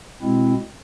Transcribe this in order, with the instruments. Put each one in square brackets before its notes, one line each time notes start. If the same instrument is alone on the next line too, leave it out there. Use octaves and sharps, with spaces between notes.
[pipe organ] B2 G#3 C4 E4